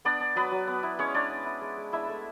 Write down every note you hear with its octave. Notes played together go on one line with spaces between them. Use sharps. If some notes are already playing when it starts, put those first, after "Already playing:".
B3 D4 D5
D4
F#3 B3 B4
F#3
B3
E4
G#3 C#4 C#5
G#3 D4 D5
C#4
E4
G#3
G#3
D4 E4 E5
A3